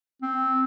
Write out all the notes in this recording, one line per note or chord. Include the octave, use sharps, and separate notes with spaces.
C4